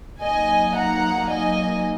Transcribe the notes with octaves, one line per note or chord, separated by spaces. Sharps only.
F#3 A#3 D#4 D#5 G#5
F#5 A#5
D#5 G#5